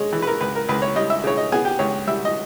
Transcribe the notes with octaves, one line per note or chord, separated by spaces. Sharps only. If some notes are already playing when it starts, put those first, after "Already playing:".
Already playing: G#3 C#5 D#5
E3
B4
A#4
C#2 B4
A#4
C#2 B4
C#5
G3 D#5
E5
C#3 C#5
D#5
B3 G#4
G4
C#2 C#5
G3 E5
D#5